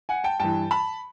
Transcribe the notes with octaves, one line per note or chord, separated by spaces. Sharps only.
F#5 G#5
G5 A5
G2 E3 G5 A5
A5 B5